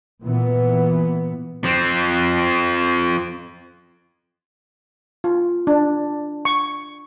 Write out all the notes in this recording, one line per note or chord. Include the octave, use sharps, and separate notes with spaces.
A#2 E3 B3
F3 C4
F4
D4
C#6